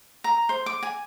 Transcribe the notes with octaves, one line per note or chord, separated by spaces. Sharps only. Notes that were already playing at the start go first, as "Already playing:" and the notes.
A#5
C5
D6
G#5